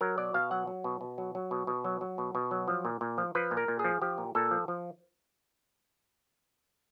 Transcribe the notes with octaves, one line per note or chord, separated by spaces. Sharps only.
F#3 A#4
B2 D5
B2 F5
F#3 F#5
F#3
B2
B2
F#3
F#3
B2
B2
F#3
F#3
B2
B2
F#3
F3
A#2
A#2
F3
F3 B4
A#2
A#4
A#2
G#4
F3
F3 G4
A#2
A#2 A4
F3
F3